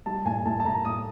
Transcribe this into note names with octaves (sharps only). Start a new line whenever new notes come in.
G3 A5
A2 G#5
A2 A5
A5
A2 A#5
A2 D#6